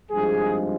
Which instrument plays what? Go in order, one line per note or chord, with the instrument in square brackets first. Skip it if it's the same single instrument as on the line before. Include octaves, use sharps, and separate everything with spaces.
[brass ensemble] G#1 G2 F3 G#3 G#4